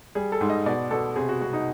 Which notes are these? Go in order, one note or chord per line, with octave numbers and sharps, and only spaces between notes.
G3 G#4
A4
G#2
D#5
B2 D5
B2 A4
C3 G#4
F#4
C3 F#4
D#4